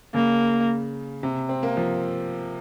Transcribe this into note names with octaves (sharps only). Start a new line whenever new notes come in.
C#3 A#3
C3
C4
A#3
F3